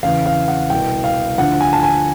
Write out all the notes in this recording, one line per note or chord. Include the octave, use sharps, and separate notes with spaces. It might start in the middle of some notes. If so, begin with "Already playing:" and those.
E2 C#3 E3 F5
F5
F#5
C2 B2 G5
F5
D2 D3 F3 F#5
G#5
A5
G#5